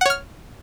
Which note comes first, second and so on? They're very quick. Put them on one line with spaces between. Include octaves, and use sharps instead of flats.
F#5 C#5 F6